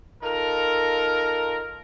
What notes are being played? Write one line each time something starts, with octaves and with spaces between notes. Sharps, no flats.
D#4 F4 A4 A#4